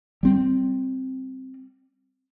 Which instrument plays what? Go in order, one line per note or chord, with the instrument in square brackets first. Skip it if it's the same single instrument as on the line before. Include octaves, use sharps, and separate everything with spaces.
[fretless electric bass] G3 C4